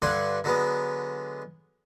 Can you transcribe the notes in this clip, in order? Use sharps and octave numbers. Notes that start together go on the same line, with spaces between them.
G2 D3 D5 F#5 G#5 C6
D3 F#3 G#3 B3